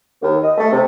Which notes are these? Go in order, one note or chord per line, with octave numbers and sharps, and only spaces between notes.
D#2
D#5
A3
C3